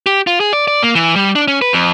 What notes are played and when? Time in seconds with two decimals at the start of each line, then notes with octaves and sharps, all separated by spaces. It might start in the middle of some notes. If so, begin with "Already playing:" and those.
0.06 G4
0.27 F4
0.40 G#4
0.53 D5
0.68 D5
0.83 A#3
0.95 E3
1.16 G3
1.35 D4
1.48 C#4
1.62 B4
1.73 F2